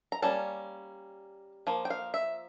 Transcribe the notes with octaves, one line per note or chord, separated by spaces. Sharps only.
A#5
G3 A#3 C#4 A5
F3 A#3
G5
F5
E5